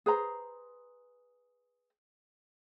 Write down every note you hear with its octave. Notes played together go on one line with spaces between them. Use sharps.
G#4 B4 C5 A#5